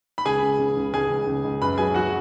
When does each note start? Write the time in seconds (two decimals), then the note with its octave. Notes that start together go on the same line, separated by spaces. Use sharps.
0.18 B5
0.25 C#2 G#4 G#5
0.42 C#2
0.59 C#3
0.77 C#2
0.93 C#2 G#4 G#5
1.10 C#2
1.27 C#2
1.45 C#2
1.62 F#2 B4 B5
1.78 F#3 G#4 G#5
1.94 F#3 F#4 F#5